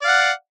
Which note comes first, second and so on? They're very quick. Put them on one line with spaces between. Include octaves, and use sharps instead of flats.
D5 F5 F#5